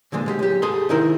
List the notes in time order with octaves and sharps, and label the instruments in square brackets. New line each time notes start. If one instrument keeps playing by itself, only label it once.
[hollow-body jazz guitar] A#2 D3 F3 G#3
B2 G#3 G4
B1 G4
C2 G#2 G#4 A4 B5 C6
C3 D#3 D#4 E4 A#4 C5